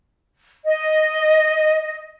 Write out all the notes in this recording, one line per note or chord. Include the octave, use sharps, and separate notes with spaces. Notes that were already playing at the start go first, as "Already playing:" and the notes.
D#5